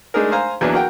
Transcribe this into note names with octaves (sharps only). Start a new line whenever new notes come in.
G#3 A3 D4 D#4 G#4 A#4
C5 F5 G#5 A#5
E2 E3 F#3 A#3 D4 E4
F#4 A#4 F#5 G5